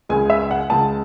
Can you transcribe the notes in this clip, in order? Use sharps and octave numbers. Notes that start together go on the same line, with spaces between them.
C#2 C#3 G#3 G#5
E5
F#5
C#2 C#3 G#3 A5